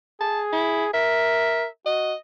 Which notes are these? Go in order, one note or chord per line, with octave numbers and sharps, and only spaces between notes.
G#4 A5
E4
A#4 E5
F#4 D#5